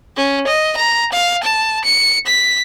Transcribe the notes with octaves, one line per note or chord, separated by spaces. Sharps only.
C#4
D#5
A#5
F5
A5
C#7
B6